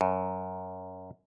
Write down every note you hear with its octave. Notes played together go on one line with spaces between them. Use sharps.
F#2